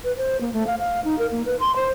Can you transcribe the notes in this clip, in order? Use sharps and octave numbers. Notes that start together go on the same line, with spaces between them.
B4
C5
A#3
A3
F5
F5
D#4
A#4
A#3
B4
C6
C5